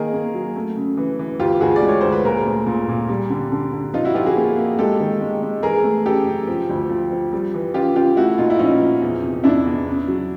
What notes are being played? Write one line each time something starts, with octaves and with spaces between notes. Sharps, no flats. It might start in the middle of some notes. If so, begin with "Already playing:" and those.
Already playing: D#3 A#3 G#4 A#4
A#3
F#3
A3
C#3
E3
E3
D2 F4 G4
D2 F#4 G#4
D5
G#3
C#5
D2 C5
B4
A#2 G#4 A#4
A3
A#2
A#2
G3
D3
D3
D3
F3 D#4 F4
E4 F#4
F3 F4 G4
F#4 G#4
A#3
A#3
G#3 G4 A4
D#3
G#3
G#3
E3 G#4 A#4
A3
C#3 G4 A4
F#2
F3
D2
F3
F3
G3
E3
C#3 F4 G4
C#3 F4 G4
A3 E4 F#4
A#2 D#4 F4
E4
F3 C#4 D#4
F3
E2
C3
E2 D4 E4
E2
C#3
F#3